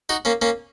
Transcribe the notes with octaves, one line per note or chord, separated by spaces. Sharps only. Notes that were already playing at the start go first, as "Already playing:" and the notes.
D#4 F#4
A#3 C#4
A#3 C#4